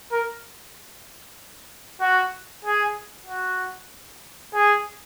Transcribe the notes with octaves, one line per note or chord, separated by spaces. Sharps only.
A#4
F#4
G#4
F#4
G#4